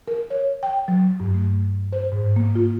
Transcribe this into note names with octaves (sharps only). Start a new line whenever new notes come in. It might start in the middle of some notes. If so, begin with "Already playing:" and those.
A#4
C#5
G5
F#3
G2
A3
C5
G#2
A#3
F4